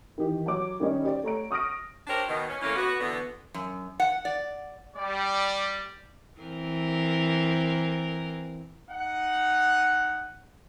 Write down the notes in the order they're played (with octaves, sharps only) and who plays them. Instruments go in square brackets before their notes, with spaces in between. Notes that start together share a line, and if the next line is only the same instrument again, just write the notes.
[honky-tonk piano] D#3 E3 G4
F#3 C#5 D6
D#3 G3 C#4 D#4
G4 D5
A3 C#5 A#5 D7
C#6 D#6 F6 A#6 D7
[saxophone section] D4 G4 A#4 C5 C#5
B2 D#3
C#4
E3 A3 A#3 C#4
B3 F#4
B2 D3 E3 B3
[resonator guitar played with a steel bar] F#2
F#5
D5
[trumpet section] G3 D5
[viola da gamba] E3 C4 A#4
[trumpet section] D#4 F#5